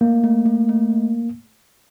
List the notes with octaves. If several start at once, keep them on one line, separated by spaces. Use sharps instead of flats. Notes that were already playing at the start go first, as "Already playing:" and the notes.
A3 A#3
A3
A3
A3